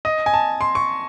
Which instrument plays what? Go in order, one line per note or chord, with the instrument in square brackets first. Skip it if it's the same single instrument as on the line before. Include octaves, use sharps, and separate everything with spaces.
[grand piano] D#5
G#5
A5
C6
C#6